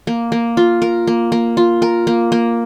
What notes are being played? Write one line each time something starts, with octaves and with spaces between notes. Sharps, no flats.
A#3
A#3
F4
A#4
A#3
A#3
F4
A#4
A#3
A#3